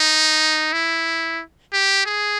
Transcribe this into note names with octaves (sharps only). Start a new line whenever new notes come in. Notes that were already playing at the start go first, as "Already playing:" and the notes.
Already playing: D#4
E4
G4
G#4